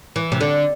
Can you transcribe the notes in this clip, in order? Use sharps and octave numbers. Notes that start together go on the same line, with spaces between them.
E3
C3
D3